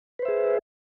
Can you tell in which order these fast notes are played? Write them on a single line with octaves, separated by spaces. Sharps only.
B4 C5 E5 G#4